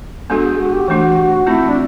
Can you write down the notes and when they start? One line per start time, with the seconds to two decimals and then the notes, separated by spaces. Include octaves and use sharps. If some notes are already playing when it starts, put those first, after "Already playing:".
0.30 G#3 B3 D4 F#4 A4
0.45 G#4
0.59 F#4
0.73 G4
0.88 E3 A3 D4 F#4
1.46 A3 C4 E4 F4
1.69 D4